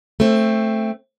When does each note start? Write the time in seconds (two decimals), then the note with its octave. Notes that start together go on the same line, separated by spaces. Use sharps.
0.20 A3 C4